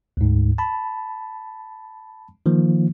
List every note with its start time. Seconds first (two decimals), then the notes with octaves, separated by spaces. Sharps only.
0.17 D2 G#2
0.58 A5 B5
2.46 D#3 F3 A#3